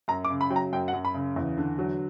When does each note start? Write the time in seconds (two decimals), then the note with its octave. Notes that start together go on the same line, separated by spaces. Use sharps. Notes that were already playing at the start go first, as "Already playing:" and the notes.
0.08 F#2 A#5
0.25 D6
0.30 C#3
0.41 B5
0.50 F#3 G5
0.56 A#5
0.73 F#2 G5
0.88 F#5
0.93 F#2
1.05 B5
1.14 C#3
1.36 E2
1.58 D3
1.79 F#3